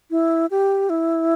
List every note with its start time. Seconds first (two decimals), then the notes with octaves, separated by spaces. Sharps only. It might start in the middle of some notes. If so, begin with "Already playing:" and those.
0.11 E4
0.51 G4
0.90 E4